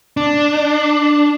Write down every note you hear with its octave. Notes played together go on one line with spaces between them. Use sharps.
D4